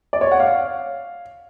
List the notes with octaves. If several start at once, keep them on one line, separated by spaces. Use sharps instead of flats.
D5
C#5
F#5
F5